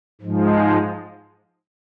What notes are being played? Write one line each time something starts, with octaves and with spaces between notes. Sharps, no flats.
G#2 F3 G#3